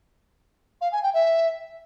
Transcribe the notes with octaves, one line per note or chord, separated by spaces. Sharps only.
F5
G#5
G5
E5